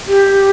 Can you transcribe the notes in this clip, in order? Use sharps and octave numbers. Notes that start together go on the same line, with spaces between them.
G4